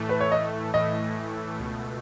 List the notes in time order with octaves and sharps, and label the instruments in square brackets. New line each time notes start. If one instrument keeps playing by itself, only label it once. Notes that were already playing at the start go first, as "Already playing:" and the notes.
Already playing: [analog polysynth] A2 E3 A3
[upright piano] B4
C#5
D#5
[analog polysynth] A2 E3 A3 [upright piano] D#5
[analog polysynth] C#2 B2 A3